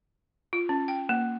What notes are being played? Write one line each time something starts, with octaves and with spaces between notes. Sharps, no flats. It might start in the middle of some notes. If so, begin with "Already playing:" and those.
F4
C#4
G5
A#3